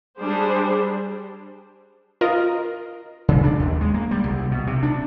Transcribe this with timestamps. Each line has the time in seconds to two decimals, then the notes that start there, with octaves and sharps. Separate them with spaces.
0.19 G3 D4 G4 G#4 C5
2.21 F4 A#4 D#5
3.28 C#3
3.44 D4
3.60 D#2
3.81 G#3
3.94 A#3
4.11 G3
4.24 C2
4.51 B2
4.67 C3
4.83 D4